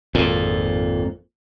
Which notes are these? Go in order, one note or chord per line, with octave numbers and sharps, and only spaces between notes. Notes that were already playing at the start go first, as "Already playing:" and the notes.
G#1 F2 A#2